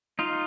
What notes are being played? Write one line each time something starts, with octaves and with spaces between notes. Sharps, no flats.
D#4 F4